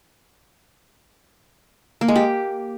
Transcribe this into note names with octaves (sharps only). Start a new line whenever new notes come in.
A#3
G#3
G4